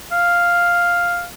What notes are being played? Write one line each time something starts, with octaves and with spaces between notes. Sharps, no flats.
F5